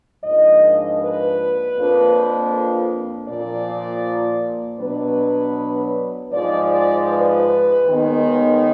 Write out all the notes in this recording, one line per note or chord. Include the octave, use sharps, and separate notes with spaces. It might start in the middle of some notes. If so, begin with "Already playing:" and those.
G#2 F3 A#3 D4 D#5
B4
F2 F3 A#3 D4
A#2 F3 A#3 D5
B2 F#3 B3 D4 B4
G#2 F3 G#3 D5
D5
B4
D#2 D#3 G#3 B3